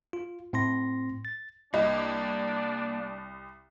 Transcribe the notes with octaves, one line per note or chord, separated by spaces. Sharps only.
F4
A2 C4 C6 A#6
A6
C2 A#3 D4 D#5